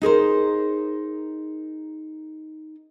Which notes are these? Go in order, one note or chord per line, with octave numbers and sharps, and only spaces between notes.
D#4 G#4 A#4 C5